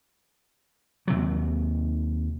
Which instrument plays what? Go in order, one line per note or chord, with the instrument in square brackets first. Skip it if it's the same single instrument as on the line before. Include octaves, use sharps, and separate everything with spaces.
[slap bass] D#2 C3 F#3